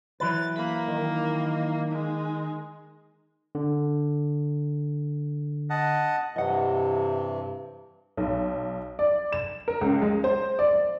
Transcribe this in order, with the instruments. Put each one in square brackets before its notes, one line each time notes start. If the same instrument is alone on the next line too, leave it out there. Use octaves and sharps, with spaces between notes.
[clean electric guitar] E3 F#3 B4 [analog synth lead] A6
[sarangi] A#3 [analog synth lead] B5
[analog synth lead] D#3
[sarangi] G#3
[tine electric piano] D3
[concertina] D#5 F#5 A5
[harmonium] G2 C3 E3 [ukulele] D#5 F#5
[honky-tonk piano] B1
D5
E7
A#4
C#2
G#3
C5
D5
D5